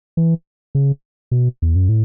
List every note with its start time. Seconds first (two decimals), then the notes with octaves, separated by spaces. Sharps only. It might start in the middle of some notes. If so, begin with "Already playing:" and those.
0.17 E3
0.75 C#3
1.31 B2
1.62 E2
1.76 F#2
1.89 A2